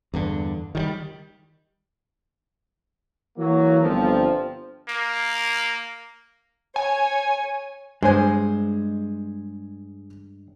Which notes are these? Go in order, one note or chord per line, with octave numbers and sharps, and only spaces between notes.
E2 G2 D3
D#3 F3 G3
E3 F#3 A#3
G1 F3 C4
A#3
C#5 G#5
G2 G#3 G#4 C5 G#5